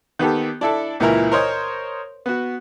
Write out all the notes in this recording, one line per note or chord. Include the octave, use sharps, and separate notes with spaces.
D#3 B3 G4 A4
D4 E4 A4
C#2 A#2 E3 E4 A#4
A#4 C5 C#5 D#5
B3 F#4